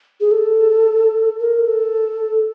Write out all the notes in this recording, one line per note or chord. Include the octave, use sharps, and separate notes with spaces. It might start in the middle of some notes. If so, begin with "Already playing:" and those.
G#4
A4
A#4
A4